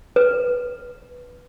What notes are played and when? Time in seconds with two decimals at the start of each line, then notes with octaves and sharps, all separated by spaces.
0.16 B4